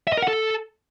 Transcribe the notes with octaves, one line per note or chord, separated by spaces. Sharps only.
E5
D#5
A#4
F#5
A4